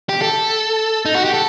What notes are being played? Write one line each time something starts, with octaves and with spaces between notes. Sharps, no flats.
G4
A4
D#4
F#4
G4
A4